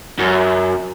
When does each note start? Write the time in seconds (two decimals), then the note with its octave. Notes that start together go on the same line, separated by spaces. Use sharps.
0.19 F#2